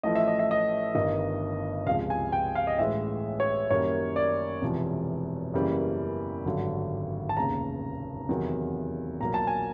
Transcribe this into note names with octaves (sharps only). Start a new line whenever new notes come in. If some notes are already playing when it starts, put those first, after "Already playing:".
A1 A2 F3 A3 D#5
E5
D#5
E5
D#5
G1 G2 D#3 D#5
C#2 C3 F3 G#3 F5
G#5
G5
F5
D#5
A1 A2 E3 G#3 E5
C#5
F#2 D#3 G3 A#3 C#5
D5
E1 E2 C3 F3
F#2 C#3 E3 G3 A#3
G#1 G2 D3 F#3
A5
F1 D#2 C#3 A#5
E2 C3 D#3 F#3
B1 A#2 F#3 A#3 A#5
A5
G#5